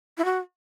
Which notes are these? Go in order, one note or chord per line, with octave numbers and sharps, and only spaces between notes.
E4
F#4